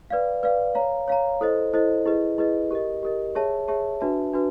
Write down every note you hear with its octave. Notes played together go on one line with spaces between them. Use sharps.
B4 D5 F5
B4 D5 F5
C#5 F5 A#5
C#5 F5 A#5
E4 A4 C5 D#5
E4 A4 C5 D#5
E4 G#4 B4 D#5
E4 G#4 B4 D#5
G4 A#4 D#5
G4 A#4 D#5
G#4 C#5 E5 A5
G#4 C#5 E5 A5
D4 F#4 B4 E5 A5
D4 F#4 B4